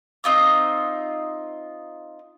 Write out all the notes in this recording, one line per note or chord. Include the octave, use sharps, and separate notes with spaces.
C4 D#4 F4 D6